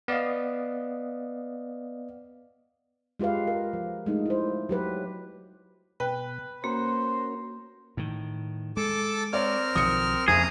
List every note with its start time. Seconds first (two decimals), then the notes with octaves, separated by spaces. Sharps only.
0.08 B3 D5 D#5 F5
3.19 G#3 F4 G4 B4 F5
3.47 A#4
3.73 F3
4.06 G#3 A3 D#4
4.26 E4 C5
4.69 F#3 G4 B4
6.00 B2 B4 G5
6.64 A#3 C#4 F#4 A#4 C5
7.97 A2 D#3
8.77 G#3 A4 A5 D6
9.33 C4 A#4 C#5 D5 F6
9.75 B1 D#3 F3 D#6 C#7
10.28 F#1 F2 G#4 A#5 D#6